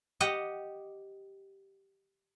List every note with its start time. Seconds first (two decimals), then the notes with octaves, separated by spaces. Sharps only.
0.20 G4 D#5 F#5